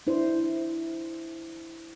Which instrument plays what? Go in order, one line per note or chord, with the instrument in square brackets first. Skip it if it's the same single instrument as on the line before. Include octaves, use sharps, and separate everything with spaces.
[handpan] D4 E4 C5